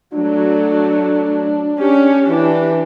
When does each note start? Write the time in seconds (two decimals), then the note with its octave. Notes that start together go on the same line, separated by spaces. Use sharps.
0.14 F#3 A3 D4
1.78 C#4 G4
2.28 E3 D4 G4